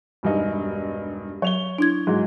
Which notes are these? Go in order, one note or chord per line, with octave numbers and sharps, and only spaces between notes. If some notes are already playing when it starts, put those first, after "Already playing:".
E1 G2 D#4
F#3 C#5 F7 G7
D4 E4 G#6
G#2 F#3 G#3